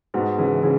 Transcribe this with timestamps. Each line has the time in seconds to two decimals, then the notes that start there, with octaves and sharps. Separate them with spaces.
0.14 G#2 B2
0.38 C#3 E3
0.63 C#3 E3